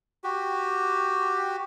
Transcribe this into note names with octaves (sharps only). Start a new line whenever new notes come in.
F#4 G4